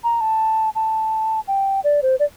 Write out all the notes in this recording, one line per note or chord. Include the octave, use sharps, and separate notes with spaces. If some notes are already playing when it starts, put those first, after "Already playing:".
A#5
A5
A5
G5
D5
C5
D5